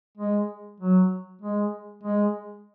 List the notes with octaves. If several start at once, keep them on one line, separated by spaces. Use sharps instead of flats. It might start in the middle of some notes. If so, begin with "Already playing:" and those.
G#3
F#3
G#3
G#3